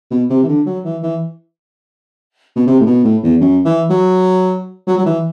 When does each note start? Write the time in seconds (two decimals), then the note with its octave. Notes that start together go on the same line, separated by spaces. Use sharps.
0.11 B2
0.30 C3
0.43 E3
0.48 D3
0.66 F#3
0.85 E3
1.03 E3
2.56 B2
2.67 C3
2.80 A2
2.86 B2
3.04 A2
3.23 E2
3.41 F#2
3.65 E3
3.90 F#3
4.87 F#3
4.98 F#3
5.06 E3